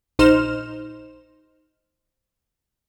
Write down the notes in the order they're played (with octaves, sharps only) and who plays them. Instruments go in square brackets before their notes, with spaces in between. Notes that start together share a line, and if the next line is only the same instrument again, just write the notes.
[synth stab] A#1 D#4 C5 F6 E7